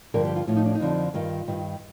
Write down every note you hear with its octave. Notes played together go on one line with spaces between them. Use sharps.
G2 D3 F3 A#4
G4
F4
A2 F3 F4
D#4
D4
D#4
F2 D3 F3
G2 D#3 F4
G2 D#3